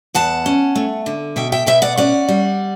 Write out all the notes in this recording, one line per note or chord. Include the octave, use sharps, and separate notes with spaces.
E2 F#5 A5
C#4
A3
D3
B2 E5 G5
E5 G5
B2 E5 G5
D5 F#5
C#4 D5 F#5
G3